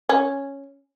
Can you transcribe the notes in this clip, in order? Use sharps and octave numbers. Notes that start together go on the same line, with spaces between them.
C#4